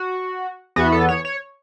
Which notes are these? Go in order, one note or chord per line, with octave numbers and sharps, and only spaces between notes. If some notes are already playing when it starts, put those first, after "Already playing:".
Already playing: F#4
E2 E3 B3 F#4
A4
C#5
C#5